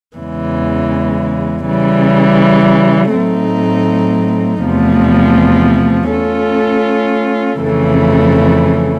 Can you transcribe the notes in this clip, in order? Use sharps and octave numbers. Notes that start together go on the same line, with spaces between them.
E2 C#3 E3 G#3
C#3 E3 G3
A2 F#3 A3 C4 D#4
E2 C3 F3 A3
A3 C#4 F4 A4
F2 C#3 E3 A3